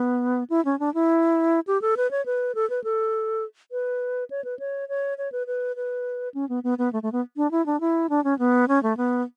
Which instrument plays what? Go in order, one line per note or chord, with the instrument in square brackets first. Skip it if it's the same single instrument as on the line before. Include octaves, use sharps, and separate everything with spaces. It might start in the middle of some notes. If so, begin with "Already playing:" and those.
Already playing: [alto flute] B3
E4
C#4
D4
E4
G4
A4
B4
C#5
B4
A4
B4
A4
B4
C#5
B4
C#5
C#5
C#5
B4
B4
B4
C#4
B3
B3
B3
A3
A3
B3
D4
E4
D4
E4
D4
C#4
B3
C#4
A3
B3